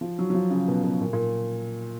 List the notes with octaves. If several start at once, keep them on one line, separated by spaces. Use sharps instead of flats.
F3
F#3
F#3
F3
C#3
B2
B2
A#2
A#2